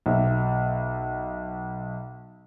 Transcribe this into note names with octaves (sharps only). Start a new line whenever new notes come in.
B1 E5